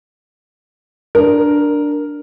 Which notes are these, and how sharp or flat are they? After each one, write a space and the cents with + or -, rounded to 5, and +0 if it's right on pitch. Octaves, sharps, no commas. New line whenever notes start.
D4 +0 A#4 +0